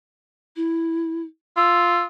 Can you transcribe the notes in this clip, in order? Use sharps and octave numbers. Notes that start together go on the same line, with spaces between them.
E4
F4 E6